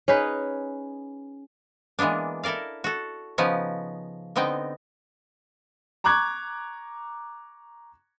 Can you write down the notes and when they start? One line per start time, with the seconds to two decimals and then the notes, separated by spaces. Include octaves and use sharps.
0.08 C#4 D#4 G#4 B4
1.99 E3 G#3 A#3 B3 D4
2.43 E4 A4 A#4 D5 F5
2.84 F#4 A4
3.38 C#3 F3 B3 C#4 D#4
4.36 D3 B3 C4 D#4 G5
6.04 A#5 C#6 D6 F#6 G#6